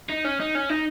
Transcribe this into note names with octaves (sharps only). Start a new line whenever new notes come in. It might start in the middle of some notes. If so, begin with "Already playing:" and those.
D#4
C#4
D#4
C#4
D#4